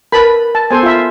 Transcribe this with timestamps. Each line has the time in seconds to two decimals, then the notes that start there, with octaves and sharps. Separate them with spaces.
0.12 A#4 B4 A5 B5
0.55 A5
0.71 B3 A4 C5 G#5
0.83 F4 E5